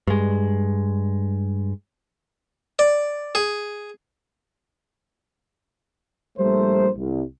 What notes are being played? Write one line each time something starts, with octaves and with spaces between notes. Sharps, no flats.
G2 G#3
D5
G#4
A#1 G3 A3 A#4 C5
C2